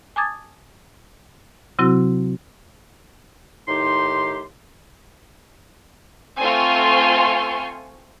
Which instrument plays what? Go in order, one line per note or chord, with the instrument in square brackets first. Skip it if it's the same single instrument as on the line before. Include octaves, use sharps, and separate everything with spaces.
[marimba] G#5 A5 D6 D#6 G#6 A6
C3 F#3 C4 E4 F#4
[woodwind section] A2 D#3 D#4 G4 C6
[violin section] A3 C4 F4 G#5 C6 C#6